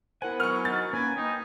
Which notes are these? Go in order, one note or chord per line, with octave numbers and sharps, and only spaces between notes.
B3 E4 A#4 C5 F#5 G#5
F#3 A#4 C#6 F6
D#4 F#4 A6
A#3 C#4 B4 G#5
D#4 G5 G6